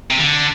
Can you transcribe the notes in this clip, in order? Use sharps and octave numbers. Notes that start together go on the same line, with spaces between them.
C3
D3